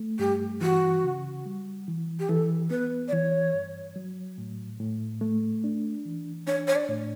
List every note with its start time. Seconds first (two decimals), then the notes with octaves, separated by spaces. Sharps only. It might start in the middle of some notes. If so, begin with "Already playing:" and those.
Already playing: A3
0.19 G2 G4
0.61 E3 F#4
1.04 C#3
1.46 G3
1.88 E3
2.19 G4
2.29 E3 A4
2.70 B3 B4
3.08 D5
3.13 E3 C#5
3.54 G2
3.96 F#3
4.38 A2
4.80 A2
5.21 A3
5.64 D4
6.05 E3
6.47 D4 C#5
6.68 C#5
6.76 D5
6.89 A2